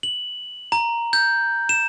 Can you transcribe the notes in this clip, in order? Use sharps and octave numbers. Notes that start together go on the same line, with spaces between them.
F#7
A#5
G6
E7